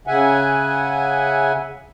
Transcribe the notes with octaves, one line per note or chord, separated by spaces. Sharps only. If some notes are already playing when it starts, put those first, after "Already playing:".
C#3 E5 F#5 G#5